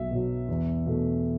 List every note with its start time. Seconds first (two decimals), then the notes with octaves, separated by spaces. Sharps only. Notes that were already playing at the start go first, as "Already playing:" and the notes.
Already playing: B1 E5
0.11 B2 F#3
0.48 E2
0.86 B2 A3